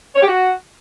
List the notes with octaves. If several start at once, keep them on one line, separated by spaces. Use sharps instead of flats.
C#5
G4
F#4